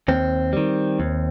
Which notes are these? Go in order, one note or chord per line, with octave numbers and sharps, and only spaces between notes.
D#2 C4
D#3 G3
D#2